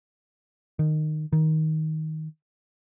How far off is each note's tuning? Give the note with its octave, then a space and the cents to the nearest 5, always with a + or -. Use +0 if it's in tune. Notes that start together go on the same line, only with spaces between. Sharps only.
D#3 -15
D#3 +15